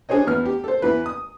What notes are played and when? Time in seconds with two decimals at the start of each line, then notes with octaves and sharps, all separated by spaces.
0.09 D4 G#4 C5 C#5 D#5
0.27 E2 B3 F6
0.45 G4
0.64 A4 C5
0.82 E2 E3 B4
1.06 D#6